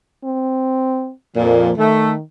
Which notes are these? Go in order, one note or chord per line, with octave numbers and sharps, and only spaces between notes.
C4
F2 A#2 F3
D#3 A3